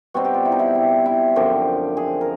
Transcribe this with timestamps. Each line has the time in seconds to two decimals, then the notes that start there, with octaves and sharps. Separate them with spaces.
0.14 B2 G3 C4 D#4 F#4
0.25 G4
0.34 F4
0.45 E4
0.52 D#4
0.59 E4
0.75 E4
1.06 E4
1.36 F#2 D3 F3 G4
1.97 G#4
2.21 A#4